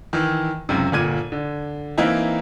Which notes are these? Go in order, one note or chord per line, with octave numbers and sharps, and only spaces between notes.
D#3 E3
C#2 F#2 C3
G1 A#2 G#6 D#7
D3
E3 A#3 C4 D#4 E4